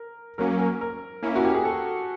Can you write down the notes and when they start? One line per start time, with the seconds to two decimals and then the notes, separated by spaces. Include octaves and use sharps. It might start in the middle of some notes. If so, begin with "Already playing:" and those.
Already playing: A#4
0.38 F#3 A#3 C#4 A#4
0.59 A#4
0.81 A#4
1.23 A#3 C#4 E4
1.36 F#4
1.45 G4
1.54 G#4
1.65 A4